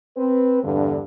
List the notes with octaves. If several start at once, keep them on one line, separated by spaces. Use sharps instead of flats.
C4 B4
E2 G2 D3